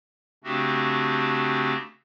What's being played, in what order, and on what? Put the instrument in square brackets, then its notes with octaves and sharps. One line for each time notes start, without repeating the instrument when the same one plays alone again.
[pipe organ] C#3 A3 C4 D4 F#4 G4